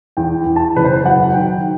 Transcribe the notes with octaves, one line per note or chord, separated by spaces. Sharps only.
E2 G5
E2
A5
F#1 B4
C5
B4
F#3 F#5
D#3 G5